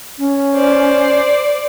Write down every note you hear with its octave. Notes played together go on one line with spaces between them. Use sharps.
C#4
C5 D5